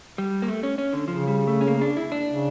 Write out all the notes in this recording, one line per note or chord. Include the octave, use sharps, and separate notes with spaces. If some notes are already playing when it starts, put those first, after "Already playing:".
G3
A#3
A3
C#4
C#4
D3
C#3 F3
G3
A3
C#4
A#3
D4
E4
D4
C#3